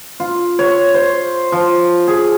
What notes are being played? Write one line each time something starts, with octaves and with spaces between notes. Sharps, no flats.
F4
C#5
C5
F3
G#4